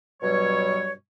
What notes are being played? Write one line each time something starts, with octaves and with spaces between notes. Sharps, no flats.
G2 B2 F#3 G3 C#5